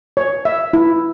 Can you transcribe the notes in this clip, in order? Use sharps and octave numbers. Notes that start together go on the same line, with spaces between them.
C#5
E5
E4